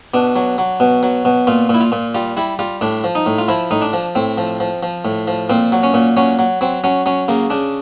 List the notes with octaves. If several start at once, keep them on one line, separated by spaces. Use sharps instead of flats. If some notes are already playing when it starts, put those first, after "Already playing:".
B2 D4
F#3
F#3
B2
F#3
B2
A#2 F4
A#2 E4
F4
A#2
G3 F4
G3 E4
G3 F4
A2 D4
F3
D#4
A2
F4
F3 E4
A2 D#4
D4
F3
A2 C4
F3
F3
F3
A2
F3
A#2 C4
F#3
C#4
A#2
F#3 C#4
F#3
F#3 C4
F#3 C#4
F#3 C#4
C#3 A#3
C#3 D4